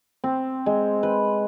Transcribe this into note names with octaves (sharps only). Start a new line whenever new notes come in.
C4
G#3
B4